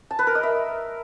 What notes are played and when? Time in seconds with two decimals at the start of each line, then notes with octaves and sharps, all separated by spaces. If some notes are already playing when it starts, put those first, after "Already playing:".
0.11 A5
0.19 B4
0.27 A#4
0.35 D#5
0.43 E5